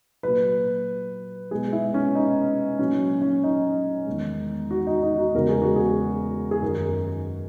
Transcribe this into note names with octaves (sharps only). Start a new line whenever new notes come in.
A#2 F#3 B4
B2 G#3 G#4
E4
C#4
D#4
A#2 F#3 C#4
C#4
D#4
E2 D#3 G#3
F#4
D#4
D#4
F#4
E2 C#3 G#3 A#4
G#4
F#4
G#4
G#4
F#2 D#3 F#3 A#4